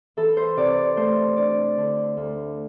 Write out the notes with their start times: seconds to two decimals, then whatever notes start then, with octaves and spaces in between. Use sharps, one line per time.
0.17 E3 A4
0.37 C5
0.57 C3 D5
0.77 D5
0.96 A3 C5
1.37 D4 D5
1.78 D3
2.17 D2